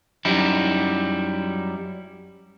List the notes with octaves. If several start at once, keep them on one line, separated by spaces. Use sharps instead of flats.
F#2 G3 D#4 E4